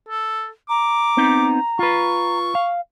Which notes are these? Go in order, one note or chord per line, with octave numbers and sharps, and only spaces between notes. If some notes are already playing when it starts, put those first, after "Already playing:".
A4
A#5 D6
B3 C4 D#4
F4 B4 C#6
F5